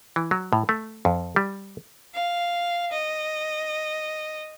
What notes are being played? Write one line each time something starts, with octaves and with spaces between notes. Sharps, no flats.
E3
F#3
A2
A3
F2
G3
F5
D#5